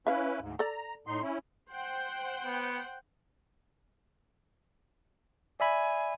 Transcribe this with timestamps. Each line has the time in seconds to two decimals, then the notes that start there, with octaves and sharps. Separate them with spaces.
0.07 C#4 E4 B4 E5 F5
0.40 D2 G#2
0.59 A4 D5 A#5
1.07 A2 D#4 C6
1.22 C#4 E4
1.71 C5 F#5 G5
2.44 B3
5.60 D5 E5 G#5 B5